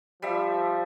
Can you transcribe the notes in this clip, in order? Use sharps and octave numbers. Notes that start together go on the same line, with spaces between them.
F3 G3 E5